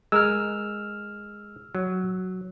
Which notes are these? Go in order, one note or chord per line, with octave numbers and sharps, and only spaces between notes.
G#3 A#4 E6 F6
F#3